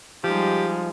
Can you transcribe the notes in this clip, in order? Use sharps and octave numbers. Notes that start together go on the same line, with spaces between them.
F3 G3 G#3 D#4 G4